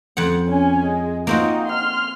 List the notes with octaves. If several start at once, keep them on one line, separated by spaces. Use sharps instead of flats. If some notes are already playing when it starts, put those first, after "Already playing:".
F2 F#5
C#4 G#5
G#3
A#3 C4 D#4 F4 F#4
C6 F6